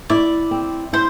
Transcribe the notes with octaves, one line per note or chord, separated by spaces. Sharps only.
E4 D5
C4
E4 C5